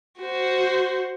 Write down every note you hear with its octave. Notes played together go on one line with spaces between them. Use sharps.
F#4 C5